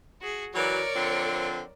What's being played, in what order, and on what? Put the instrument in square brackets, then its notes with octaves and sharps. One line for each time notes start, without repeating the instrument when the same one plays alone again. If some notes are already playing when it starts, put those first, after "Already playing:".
[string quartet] F#4 G#4
[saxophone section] E3 F#3 [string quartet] A#4 C#5 D5
[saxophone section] D3 F3 C4